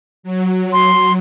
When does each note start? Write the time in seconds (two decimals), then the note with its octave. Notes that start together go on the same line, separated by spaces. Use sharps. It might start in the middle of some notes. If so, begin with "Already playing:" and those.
0.23 F#3
0.73 C6